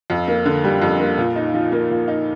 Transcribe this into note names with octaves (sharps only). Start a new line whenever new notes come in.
F2
A#3
D3
G3
F2
A#3
A#2
D#4
F3
A#3
A#2
D#4